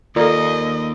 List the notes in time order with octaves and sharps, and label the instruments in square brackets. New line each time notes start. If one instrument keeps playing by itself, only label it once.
[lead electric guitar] D#2 [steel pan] F4 A#4 [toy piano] A4 D5 [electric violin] D#5